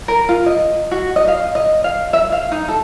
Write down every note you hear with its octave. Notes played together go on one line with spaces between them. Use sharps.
A#4
F4
D#5
F#4
D#5
F5
D#5
F5
E5
F5
D#4
A4